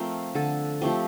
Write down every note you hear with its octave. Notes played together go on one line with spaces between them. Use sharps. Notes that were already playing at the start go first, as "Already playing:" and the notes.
Already playing: F3 A3 C4 A#4
D3 A4
F3 A3 C4 G4